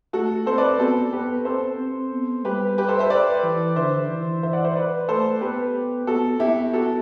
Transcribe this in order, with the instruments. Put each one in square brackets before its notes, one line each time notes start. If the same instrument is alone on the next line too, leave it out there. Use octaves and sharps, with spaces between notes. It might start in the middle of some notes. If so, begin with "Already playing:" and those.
[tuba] A3 [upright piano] F#4 A4
[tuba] C4 [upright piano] A4 C5
[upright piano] B4 D5
[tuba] B3 [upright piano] F#4 A4
[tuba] B3 [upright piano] G4 B4
[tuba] C4 [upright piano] A4 C5
[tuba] C4
B3
[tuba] G3 [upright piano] G4 B4
[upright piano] G4 B4
A4 C5
C5 E5
B4 D5
[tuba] E3
[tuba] D3 [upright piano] C5 E5
[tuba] E3
[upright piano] C5 E5
D5 F#5
C5 E5
B4 D5
[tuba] A3 [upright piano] A4 C5
[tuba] B3 [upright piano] G4 B4
[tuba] B3 [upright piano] F#4 A4
[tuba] B3 [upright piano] E4 G4
[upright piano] F#4 A4